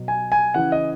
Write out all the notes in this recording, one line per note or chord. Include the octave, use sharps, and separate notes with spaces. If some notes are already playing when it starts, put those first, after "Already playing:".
Already playing: B2 F#3
G#5
G#5
C#3 E3 F#5
D#5